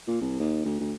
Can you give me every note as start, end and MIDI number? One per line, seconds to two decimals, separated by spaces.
0.07 0.19 46
0.21 0.39 36
0.40 0.61 39
0.65 0.77 38
0.80 0.94 38